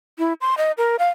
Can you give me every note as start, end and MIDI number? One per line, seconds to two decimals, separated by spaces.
0.19 0.33 64
0.41 0.55 84
0.58 0.72 75
0.78 0.96 70
0.99 1.10 77